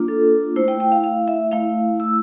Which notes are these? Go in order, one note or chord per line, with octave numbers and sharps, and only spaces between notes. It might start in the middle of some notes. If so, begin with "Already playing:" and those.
Already playing: A#3 D4 F4
A4
A3 E4 C5
G5
G5
F5
F5
E5
A3 E4 F5
E6